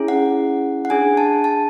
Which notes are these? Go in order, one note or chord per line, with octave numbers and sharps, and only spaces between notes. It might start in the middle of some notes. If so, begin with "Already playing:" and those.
Already playing: C#4 E4 G#4
F#5
F#5
D4 G#4 G#5
A5
A5